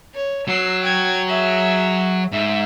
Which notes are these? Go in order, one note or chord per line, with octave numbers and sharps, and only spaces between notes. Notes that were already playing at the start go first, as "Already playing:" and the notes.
C#5
F#3 E6 C7
G5 G#6
G#4 E5
G#2 E5